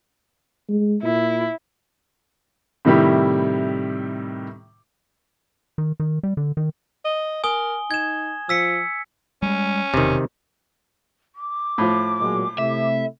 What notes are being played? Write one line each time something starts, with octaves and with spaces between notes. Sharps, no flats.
G#3
A#2 E4
A2 C3 D#3 G3 E4 G4
D#3
D#3
G3
D3
D#3
D#5
A#4 G#5 D#6 G7
D#4 G#6 E7
F3 E6 B6 C#7
G3 G#3 C#4
E1 C3 D#3
D6
A2 F3
A#2 F#3 G#3
C3 A3 E4 E5